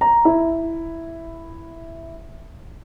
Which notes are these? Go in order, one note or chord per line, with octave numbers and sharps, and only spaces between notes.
A#5
E4